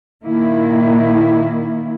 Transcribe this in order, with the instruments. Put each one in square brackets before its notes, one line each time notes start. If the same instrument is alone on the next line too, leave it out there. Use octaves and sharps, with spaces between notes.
[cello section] A#2 D#3 A#3 E4